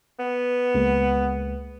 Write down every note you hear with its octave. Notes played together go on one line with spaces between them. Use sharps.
B3
C#2 G#3 A#3